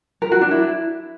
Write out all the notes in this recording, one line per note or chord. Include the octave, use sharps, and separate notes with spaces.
A#4
F#4
D4
E4